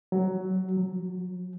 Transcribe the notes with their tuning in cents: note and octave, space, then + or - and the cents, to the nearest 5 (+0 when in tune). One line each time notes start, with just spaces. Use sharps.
F#3 +15
F#3 -40